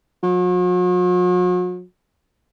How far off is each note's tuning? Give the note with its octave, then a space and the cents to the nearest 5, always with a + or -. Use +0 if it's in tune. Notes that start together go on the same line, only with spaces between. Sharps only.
F#3 -45